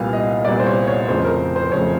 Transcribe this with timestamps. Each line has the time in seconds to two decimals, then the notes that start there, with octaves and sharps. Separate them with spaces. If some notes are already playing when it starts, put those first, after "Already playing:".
Already playing: C2 A#2 G3 B3 F5
0.13 D#5
0.45 C2 A#2 G3 B3 D5
0.60 C5
0.66 C#5
0.87 C#5
1.09 F2 C#3 F3 A3 C5
1.25 A#4
1.56 C5
1.71 F2 C#3 F3 A3 C#5